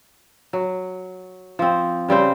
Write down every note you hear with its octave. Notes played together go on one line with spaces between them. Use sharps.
F#3
F3 C4
C#3 G3 C4 C5